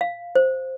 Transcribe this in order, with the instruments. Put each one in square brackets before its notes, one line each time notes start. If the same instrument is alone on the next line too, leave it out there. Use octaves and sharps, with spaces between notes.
[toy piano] F5
C5